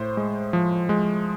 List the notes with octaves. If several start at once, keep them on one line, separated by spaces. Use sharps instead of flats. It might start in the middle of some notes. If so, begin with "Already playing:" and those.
Already playing: A2 C5
G#3
F3
G#3